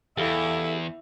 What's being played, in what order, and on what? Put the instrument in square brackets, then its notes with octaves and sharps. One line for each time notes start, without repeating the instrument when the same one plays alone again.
[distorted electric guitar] E2 [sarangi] E4 [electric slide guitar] G4 A4 F5